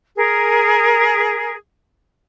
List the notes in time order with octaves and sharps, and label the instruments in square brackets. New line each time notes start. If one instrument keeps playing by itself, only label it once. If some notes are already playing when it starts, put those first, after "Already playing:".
[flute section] G#4 A#4